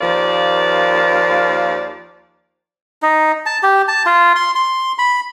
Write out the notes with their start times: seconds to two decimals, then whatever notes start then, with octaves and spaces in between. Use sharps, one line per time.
0.01 D#2 F3 A#3 D5 F5
3.02 D#4
3.46 A5
3.63 G4
3.88 A5
4.06 F4
4.36 C6
4.55 C6
4.98 B5